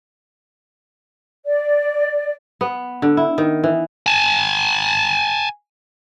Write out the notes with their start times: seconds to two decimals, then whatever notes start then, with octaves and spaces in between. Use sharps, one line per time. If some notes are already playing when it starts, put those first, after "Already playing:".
1.46 D5
2.61 B3
3.02 D3
3.17 E4
3.38 D#3
3.64 E3
4.06 G#5 A5